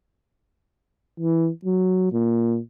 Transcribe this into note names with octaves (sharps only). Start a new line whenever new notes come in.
E3
F#3
A#2